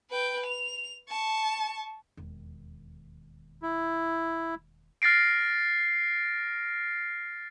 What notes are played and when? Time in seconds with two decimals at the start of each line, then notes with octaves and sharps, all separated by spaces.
0.10 B4 G5
0.46 F7
1.09 A5 C#6
2.17 E1 D#2
3.63 E4
5.02 F6 A6 A#6 C7 D7